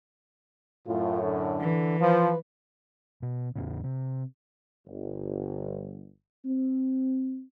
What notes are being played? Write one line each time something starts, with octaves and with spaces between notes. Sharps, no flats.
F#2 A2 F4
D3
E3
F3 B4
B2
E2 A2 C#3
C3
G1
C4